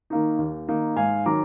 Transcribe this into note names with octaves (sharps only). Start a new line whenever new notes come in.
D#3 A#3 D#4
D#2
D#3 A#3 D#4
G#2 F5 G#5
D#3 F#3 A#5 D6